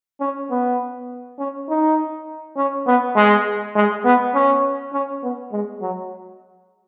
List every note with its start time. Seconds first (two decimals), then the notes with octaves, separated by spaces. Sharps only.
0.21 C#4
0.51 B3
1.39 C#4
1.69 D#4
2.57 C#4
2.87 B3
3.16 G#3
3.75 G#3
4.05 B3
4.34 C#4
4.93 C#4
5.23 B3
5.52 G#3
5.81 F#3